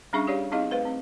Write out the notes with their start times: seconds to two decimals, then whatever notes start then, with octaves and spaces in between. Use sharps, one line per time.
0.13 G3 C#4 D4 G#4 E5 C#6
0.27 G4 C#5 D5 F5
0.52 C4 D#4 E4 G#4 D#5 F5
0.71 A3 B4 C5 F5
0.85 C4